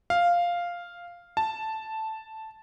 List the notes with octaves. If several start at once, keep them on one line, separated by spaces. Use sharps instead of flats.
F5
A5